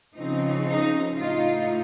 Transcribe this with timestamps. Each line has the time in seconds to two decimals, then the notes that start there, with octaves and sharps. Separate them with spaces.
0.15 C#3 F3 C4 D#4
0.67 D#4
1.19 A2 A3 D#4 F4